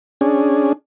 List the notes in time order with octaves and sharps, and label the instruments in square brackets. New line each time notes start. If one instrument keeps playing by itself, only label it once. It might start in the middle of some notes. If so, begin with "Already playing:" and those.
[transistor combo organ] C#4 D4 G#4